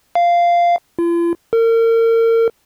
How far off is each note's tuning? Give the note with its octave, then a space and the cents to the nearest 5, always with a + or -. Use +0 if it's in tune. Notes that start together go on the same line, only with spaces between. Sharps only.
F5 -10
F4 -45
A#4 -35